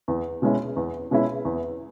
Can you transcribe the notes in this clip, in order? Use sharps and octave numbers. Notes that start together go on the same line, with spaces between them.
E2
B2 G#3 C#4 E4
E2
B2 G#3 C#4 E4
E2